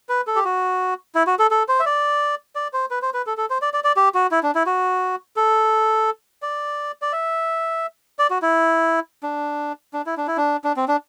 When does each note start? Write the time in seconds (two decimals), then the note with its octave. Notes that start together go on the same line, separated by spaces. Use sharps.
0.09 B4
0.27 A4
0.36 G4
0.45 F#4
1.15 E4
1.27 F#4
1.39 A4
1.51 A4
1.68 C5
1.80 E5
1.86 D5
2.55 D5
2.73 C5
2.91 B4
3.02 C5
3.14 B4
3.27 A4
3.37 A4
3.50 C5
3.62 D5
3.74 D5
3.84 D5
3.97 G4
4.15 F#4
4.31 E4
4.43 D4
4.55 E4
4.66 F#4
5.36 A4
6.42 D5
7.02 D5
7.13 E5
8.19 D5
8.30 F#4
8.42 E4
9.23 D4
9.93 D4
10.06 E4
10.17 D4
10.27 E4
10.37 D4
10.64 D4
10.77 C4
10.88 D4